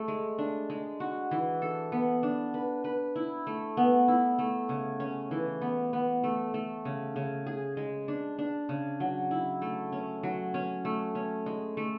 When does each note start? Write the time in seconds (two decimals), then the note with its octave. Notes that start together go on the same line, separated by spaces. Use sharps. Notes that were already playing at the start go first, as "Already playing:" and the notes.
Already playing: A3 G#4
0.08 G#3
0.38 D4
0.70 G#3
1.00 F#4
1.31 E3
1.62 A4
1.92 B3
2.23 D4
2.54 B4
2.84 B4
3.16 E4
3.47 A3
3.77 B3
4.08 E4
4.39 A3
4.69 C#3
5.00 C#4
5.31 E3
5.61 B3
5.93 B3
6.24 A3
6.54 A3
6.85 C#3
7.16 C#3
7.46 G#4
7.77 G#3
8.08 D4
8.39 D4
8.69 C#3
9.00 F#3
9.31 E4
9.62 A3
9.92 C#4
10.23 F#3
10.54 C#4
10.85 A3
11.15 C#4
11.46 G#3
11.77 A3